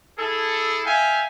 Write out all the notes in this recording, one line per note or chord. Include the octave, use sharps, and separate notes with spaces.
E4 G#4 A4
E5 F5 G5 G#5